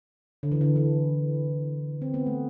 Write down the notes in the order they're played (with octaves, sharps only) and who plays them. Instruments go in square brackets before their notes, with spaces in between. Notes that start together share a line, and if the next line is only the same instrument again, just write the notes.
[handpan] D3
E3
D3
E3
C4
B3
A3